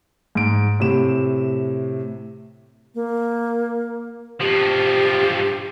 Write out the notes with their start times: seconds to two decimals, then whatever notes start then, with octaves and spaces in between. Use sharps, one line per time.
0.35 G#2 D7
0.80 A2 C3 E7
2.95 A#3
4.40 G2 F3 G4